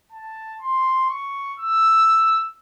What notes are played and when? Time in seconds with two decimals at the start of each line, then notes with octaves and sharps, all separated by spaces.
0.12 A5
0.61 C6
1.10 C#6
1.59 E6